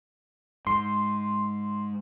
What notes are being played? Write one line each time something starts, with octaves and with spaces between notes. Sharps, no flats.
G#2 C6